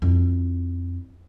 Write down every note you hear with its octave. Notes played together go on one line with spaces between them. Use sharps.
F2 E4